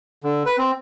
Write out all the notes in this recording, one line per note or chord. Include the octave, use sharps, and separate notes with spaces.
D3
B4
C4